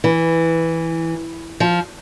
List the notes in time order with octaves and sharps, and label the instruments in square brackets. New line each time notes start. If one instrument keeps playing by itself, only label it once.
[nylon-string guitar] E3
F3